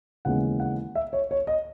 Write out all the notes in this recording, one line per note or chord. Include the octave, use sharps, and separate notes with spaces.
D#2 C#3 E3 G#3 B3 F#5
F#5
E5
C#5
C#5
D#5